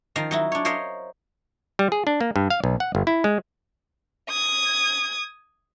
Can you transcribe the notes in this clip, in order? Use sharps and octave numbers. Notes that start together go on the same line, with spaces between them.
D#3 F3 F5 A#5
F#3 D#4 E4
D4 C#5
A#4 C5 C#5 D#5 F5
G3
G#4
D4
A#3
G2
F5
B1
F#5
G1
E4
G#3
D#6 G#6